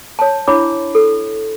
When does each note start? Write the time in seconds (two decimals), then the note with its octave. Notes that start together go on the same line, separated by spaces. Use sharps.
0.19 C#5 A5
0.48 D4 E4 C#5 B5 D6
0.95 A4